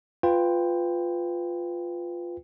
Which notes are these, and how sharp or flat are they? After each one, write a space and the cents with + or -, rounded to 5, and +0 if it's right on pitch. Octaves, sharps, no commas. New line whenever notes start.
F4 +0 B4 +15 G5 +10